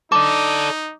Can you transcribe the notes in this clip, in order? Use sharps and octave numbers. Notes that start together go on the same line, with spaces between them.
D#4 A4 D5 D6